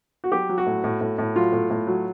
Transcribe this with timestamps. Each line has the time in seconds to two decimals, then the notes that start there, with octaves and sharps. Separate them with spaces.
0.24 F#4
0.32 F#3 G4
0.49 F#3
0.58 F#4
0.66 A2
0.84 A2
1.01 A2
1.18 A2
1.36 F#3 F4
1.53 A2
1.70 A2
1.87 F#3